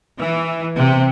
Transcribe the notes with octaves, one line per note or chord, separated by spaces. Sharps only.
E3
C3